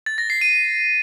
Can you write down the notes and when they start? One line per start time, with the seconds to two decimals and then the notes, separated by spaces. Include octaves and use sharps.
0.06 A6
0.18 A#6
0.30 C7
0.41 D#7